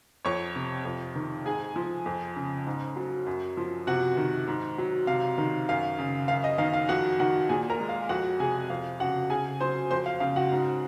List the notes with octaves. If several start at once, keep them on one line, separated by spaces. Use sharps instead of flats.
F2 C#5 C#6
C3
F2
D#3
G#2 G#4 G#5
F3
F2
C#3
G#2
F#3
F#2
F3
C3 F#4 F#5
D#3
G#2
F#3
C3 F5
D#3
F#2 F5
C#3
F#2 F5
D#5
D#3 F5
F5
F2 F#4 F#5
D#3 F#4 F#5
A#2 G#4 G#5
A#4 A#5
G#3
F5
F2 F#4 F#5
C3 G#4 G#5
F2 F5
C#3 F#4 F#5
C#3 G#4 G#5
F#3 C5 C6
F2 C5 C6
F5
C#3 F5
F#4 F#5
G#2